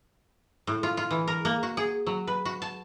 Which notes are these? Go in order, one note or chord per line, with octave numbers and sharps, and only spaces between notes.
A2
F4
F4
E3
A#4
A#3
F#4
G#4
F#3
B4
F#4
A5